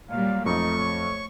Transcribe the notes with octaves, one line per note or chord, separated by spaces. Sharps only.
A#2 F#3 G3 F5
F2 A3 D#4 C#6
C#5